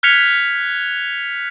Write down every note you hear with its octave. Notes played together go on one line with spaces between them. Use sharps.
F6 F#6 G#6 B6 C#7 F7